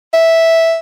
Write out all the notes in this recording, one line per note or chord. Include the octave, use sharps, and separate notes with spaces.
E5